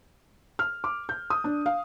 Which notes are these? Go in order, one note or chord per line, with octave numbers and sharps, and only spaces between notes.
F6
D6
G6
D#6
D4
F5